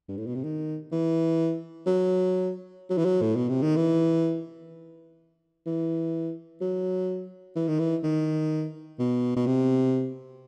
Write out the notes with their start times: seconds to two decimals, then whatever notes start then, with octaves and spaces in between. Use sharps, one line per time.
0.08 G2
0.17 A2
0.27 B2
0.35 C3
0.44 D#3
0.92 E3
1.86 F#3
2.90 F#3
2.98 E3
3.05 F#3
3.22 A2
3.36 B2
3.49 C3
3.62 D#3
3.76 E3
5.66 E3
6.61 F#3
7.56 E3
7.68 D#3
7.79 E3
8.04 D#3
8.99 B2
9.36 B2
9.46 C3